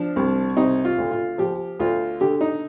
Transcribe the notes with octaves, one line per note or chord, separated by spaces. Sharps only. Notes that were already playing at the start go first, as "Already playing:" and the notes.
Already playing: F3 D4
C2
C3 D#4
F4
D2
F4
F3 G4
D2 F4
D3 G4
D#4